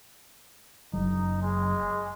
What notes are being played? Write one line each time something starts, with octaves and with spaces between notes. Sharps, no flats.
F#1 F#3 D#4
G#3